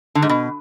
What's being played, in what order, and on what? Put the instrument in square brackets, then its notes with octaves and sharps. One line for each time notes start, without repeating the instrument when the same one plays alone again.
[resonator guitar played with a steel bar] D3
G#2
B2